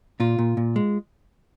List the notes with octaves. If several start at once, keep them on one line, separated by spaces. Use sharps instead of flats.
A#2 F4
A#2
A#2
G#3